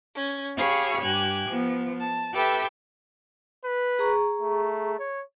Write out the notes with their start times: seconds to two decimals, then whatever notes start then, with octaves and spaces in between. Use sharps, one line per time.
0.14 C#4 G#6
0.56 G4 G#4 C#5 F5 B5 C#6
1.01 G2 G4 G#5 F#6
1.49 F3 B3
1.99 A5
2.33 G4 A4 B4 E5 G5
3.64 B4
3.99 G#4 A#5 C#6
4.41 A3
4.99 C#5